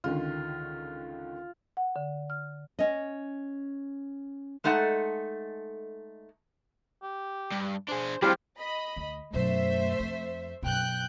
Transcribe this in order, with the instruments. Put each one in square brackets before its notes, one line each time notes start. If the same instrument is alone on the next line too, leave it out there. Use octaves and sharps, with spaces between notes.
[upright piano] C#2 D3 D#3 [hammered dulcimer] F4
[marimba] F#5
D3
F6
[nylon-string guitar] C#4 D#5
[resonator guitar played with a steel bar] G#3 A3 D#4 A4 F#5
[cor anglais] G4
[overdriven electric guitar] G2
[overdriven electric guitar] D4 G#4 [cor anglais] C5
[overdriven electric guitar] F#3 G#3 [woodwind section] C4 E4 F4 [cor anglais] D4 [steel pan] G4
[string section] D#5 B5
[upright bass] D2
[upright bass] F#2 B2 [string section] A3 C5 E5
[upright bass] F2
[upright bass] F#2 B2 [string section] G5 F#6 G6